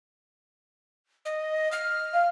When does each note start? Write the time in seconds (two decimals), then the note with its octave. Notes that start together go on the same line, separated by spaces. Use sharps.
1.25 D#5
1.72 F6
2.13 F5